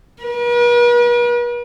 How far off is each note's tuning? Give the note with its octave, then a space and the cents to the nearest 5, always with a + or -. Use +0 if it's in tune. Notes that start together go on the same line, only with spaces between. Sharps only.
B4 -45